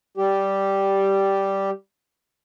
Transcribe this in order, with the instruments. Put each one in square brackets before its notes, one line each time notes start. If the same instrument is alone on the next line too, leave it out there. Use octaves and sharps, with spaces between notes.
[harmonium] G3 G4